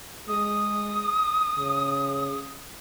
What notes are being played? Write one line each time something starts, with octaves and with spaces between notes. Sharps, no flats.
G#3 D#6
C#3